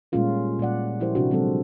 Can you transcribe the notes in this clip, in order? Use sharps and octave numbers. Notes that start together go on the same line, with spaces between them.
A#2 G3 G#3 C#4 F4 A#4
A#2 G3 D5 F#5
F3 E4 G4 A#4 C5
C3 D4 E4 F#4
D3 F#3 G#3 C4 E4 A4